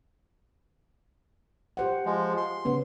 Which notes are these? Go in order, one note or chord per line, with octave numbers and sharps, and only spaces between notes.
G4 C5 F#5
F3 G#3
C6
C#3 B3 C#4